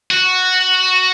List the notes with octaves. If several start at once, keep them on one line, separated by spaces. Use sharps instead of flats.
F#4